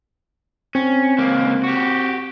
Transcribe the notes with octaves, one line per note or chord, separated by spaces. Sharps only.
C4 C#4
C#2 A#3
F#4 G4